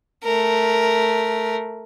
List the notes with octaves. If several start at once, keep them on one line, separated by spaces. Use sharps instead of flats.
A3 A#4